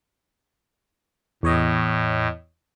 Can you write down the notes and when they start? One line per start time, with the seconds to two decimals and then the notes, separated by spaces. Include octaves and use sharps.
1.43 E2 A2 C#5 D#5